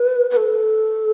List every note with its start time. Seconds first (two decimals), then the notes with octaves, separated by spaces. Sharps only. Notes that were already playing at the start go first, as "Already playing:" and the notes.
Already playing: B4
0.30 B4
0.37 A4